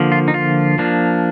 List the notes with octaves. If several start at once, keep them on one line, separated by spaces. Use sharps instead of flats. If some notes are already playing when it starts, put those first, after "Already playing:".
Already playing: D3 F3 A#3
F4
D#4
F4
F3 A#3 D4